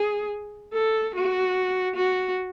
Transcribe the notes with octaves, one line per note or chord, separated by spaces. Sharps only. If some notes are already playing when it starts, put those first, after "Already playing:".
Already playing: G#4
A4
F#4
F#4